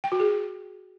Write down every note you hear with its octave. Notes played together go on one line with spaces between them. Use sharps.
G5
F#4
G#4